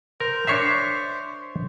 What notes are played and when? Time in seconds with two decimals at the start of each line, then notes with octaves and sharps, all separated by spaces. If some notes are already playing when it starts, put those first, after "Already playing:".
0.20 A#4 C5
0.47 D4 C#5 E5 C#6 B6 C7